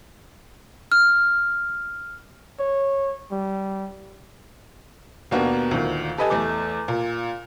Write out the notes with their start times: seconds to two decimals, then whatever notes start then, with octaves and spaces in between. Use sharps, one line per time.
0.92 F6
2.60 C#5
3.31 G3
5.31 D#2 B2 A#3 B3 D4
5.71 D2 A#2 D#3
6.18 G4 A4 B4 D#5 G#5 A5
6.30 E2 A3 D6
6.88 A#2